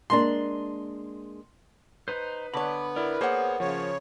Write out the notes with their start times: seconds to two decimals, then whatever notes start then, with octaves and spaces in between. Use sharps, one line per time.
0.10 G#3 A#3 D4 C6
2.08 D#4 B4 C5
2.54 D3 B3 C#5 B5 D6
2.96 E4 A#4 D5
3.21 A#3 G#4 C5 C#5 F#5
3.60 C#3 F3 C#5